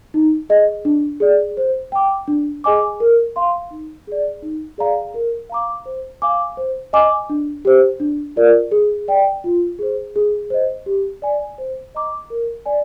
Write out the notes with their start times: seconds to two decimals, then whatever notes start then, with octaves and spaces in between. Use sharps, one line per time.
0.14 D#4
0.49 G#4 D#5
0.85 D4
1.20 G#4 D5
1.57 C5
1.92 G5 D6
2.28 D4
2.64 G#4 D#5 G#5 D6
3.00 A#4
3.36 F5 C6
3.71 D#4
4.07 G#4 D5
4.42 D#4
4.78 G#4 D5 F5 A#5
5.14 A#4
5.49 F5 A#5 D6
5.86 C5
6.22 F5 G#5 D6
6.57 C5
6.93 D#5 G#5 D6
7.30 D4
7.65 G4 C5
8.00 D4
8.36 F4 A#4 D5
8.71 G#4
9.08 D5 G5
9.44 F4
9.79 G#4 C5
10.16 G#4
10.50 C5 D#5
10.86 G4
11.22 D5 G#5
11.58 C5
11.95 D#5 A#5 D6
12.30 A#4
12.66 D5 G#5